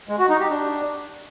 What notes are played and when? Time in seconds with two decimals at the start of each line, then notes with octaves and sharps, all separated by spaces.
0.09 G#3
0.19 F#4
0.29 D#4
0.40 G4
0.50 D4